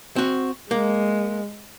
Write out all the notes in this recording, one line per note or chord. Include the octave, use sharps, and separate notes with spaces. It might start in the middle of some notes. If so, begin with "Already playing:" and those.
C4 F#4
G#3 A#3